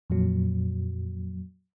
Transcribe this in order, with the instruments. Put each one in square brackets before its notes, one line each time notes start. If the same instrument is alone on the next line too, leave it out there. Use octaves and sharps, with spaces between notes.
[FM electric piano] F2 A#2 F#3